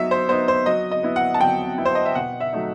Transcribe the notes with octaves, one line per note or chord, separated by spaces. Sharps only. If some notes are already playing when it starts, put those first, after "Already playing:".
Already playing: F#3 B3 D#4 E5
C5
B3 D#4 C5
C5
F#3 D#5
D#5
B3 E4
F#5
A5
F#3 G5
B3 E4
C5
D#5
E5
B2 F#5
E5
F#3 A3 D#4